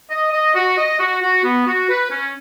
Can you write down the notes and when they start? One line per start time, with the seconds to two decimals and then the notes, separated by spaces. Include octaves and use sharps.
0.11 D#5
0.33 D#5
0.55 F#4
0.78 D#5
0.99 F#4
1.22 F#4
1.45 B3
1.66 F#4
1.89 B4
2.11 C#4